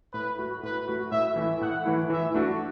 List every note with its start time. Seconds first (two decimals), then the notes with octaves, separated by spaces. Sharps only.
0.13 A2 B4
0.39 A3 F#4
0.63 A2 B4
0.88 A3 F#4
1.11 A2 E5
1.36 E3 A3 E4
1.61 A2 F#5
1.86 E3 A3 E4
2.10 E3 E5
2.34 A3 D4 F#4